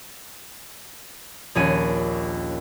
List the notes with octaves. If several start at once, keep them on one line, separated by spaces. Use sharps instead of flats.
A#1 D#2 C#4 D#7